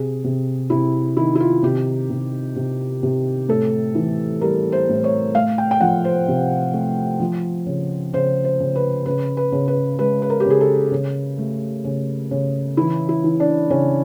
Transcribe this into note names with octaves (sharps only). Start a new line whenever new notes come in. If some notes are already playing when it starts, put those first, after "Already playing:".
Already playing: C3 G#4
C3
C3 E4
D#3 E4
E4
F4
C3 G4
C3
C3
C3
A2 A4
E3
G3 A#4
C5
A2
C#5
A3 F5
G5
G5
F3 F#5
C5
C3
A3
F3
C#3
C#3 C5
C5
C#3
B4
C#3 B4
B4
C#3
B4
G#3 B4
B4
A#4
G4
C#3 G#4
A4
C#3
A3
C#3
C#3
E3 E4
E4
E3
D4
C#3 C#4